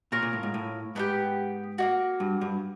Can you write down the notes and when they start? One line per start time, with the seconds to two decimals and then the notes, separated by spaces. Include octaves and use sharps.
0.12 A#2 F4 A#4 C#5
0.22 A#2
0.33 A2
0.43 G#2
0.54 A2
0.95 G#2 B3 D4 G4
1.78 A#3 D4 F#4
2.20 G2
2.41 G2